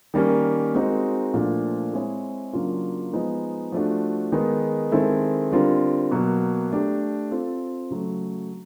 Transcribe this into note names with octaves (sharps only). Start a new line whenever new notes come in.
D#3 G3 A#3 C#4
G#3 C4 D#4 F#4 A#4
A#2 F3 A3 D4
G#3 C4 E4 G#4 C#5
C#3 F#3 A#3 D4 F4
F3 G#3 B3 D#4 G#4
F3 A3 D4 F#4
D#3 G#3 B3 D#4
D#3 G#3 C4 E4 A4
D3 G3 C4 F4 A#4
B2 F#3 A#3
A3 D4 G4
C4 F4 A4
C#3 F#3 A3